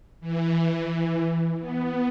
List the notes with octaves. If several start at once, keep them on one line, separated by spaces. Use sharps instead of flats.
E3
B3